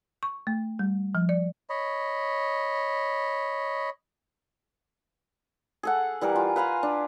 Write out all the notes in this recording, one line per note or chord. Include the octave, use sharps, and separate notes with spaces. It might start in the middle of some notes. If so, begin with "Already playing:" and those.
C#6
A3
G3
F3
D5
C#5 D#5 B5
G#4 A4 F#5
E3 G3 G#4 A#4
F4
B4 F5 G#5 A#5
D4